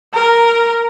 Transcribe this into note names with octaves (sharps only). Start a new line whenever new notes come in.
A#4